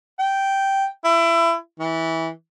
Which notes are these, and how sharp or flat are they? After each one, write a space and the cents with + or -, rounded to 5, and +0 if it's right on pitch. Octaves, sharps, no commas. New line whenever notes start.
G5 -5
E4 +25
E3 -20